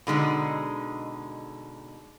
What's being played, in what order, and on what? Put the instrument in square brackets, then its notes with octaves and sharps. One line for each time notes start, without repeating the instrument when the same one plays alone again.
[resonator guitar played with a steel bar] B2 D3 G#3 D#4